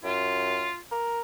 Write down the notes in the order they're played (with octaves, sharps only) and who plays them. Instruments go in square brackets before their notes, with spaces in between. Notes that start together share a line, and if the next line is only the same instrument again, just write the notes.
[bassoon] F#2 [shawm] F4
[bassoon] A#4